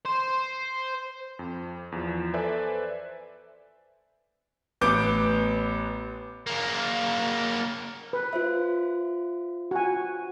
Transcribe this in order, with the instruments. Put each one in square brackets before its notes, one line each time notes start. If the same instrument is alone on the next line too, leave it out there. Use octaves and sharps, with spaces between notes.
[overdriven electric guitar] C5
[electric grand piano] F2
E2 F3
A4 B4 C5 D5 E5 G#5
[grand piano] A1 B3 D6 G6 D7
[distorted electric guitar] C#3 A#3
[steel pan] B4
[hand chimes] F4 C5 E5
[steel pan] F#4 G#5